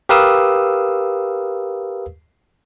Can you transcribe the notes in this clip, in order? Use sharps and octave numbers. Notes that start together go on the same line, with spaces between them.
G4 A#4 B4 F5 D#6 E6